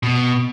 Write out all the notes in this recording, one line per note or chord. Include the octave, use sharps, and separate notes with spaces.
B2